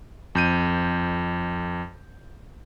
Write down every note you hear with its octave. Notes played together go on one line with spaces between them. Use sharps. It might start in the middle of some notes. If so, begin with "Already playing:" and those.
F2 G6 D#7